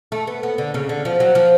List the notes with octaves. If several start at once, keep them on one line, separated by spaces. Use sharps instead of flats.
A3
B3
B3
D3
C#3
D3
F3
F#3
F3